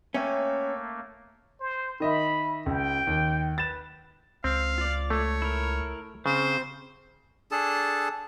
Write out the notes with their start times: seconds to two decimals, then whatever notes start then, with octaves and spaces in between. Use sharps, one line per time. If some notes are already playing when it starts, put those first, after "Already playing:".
0.14 A3 A#3 C#4 C#5 E5 G5
1.60 C5
2.00 D#3 D#5 E5 B5
2.66 C#2 G5
3.07 D#2
3.58 B4 A6 E7
4.44 C#2 C4 F5
4.78 F4 D5
5.10 A3 C#5
5.42 E4 A#4
6.26 C#3 C4 C5
7.51 D4 G#4 A4 A5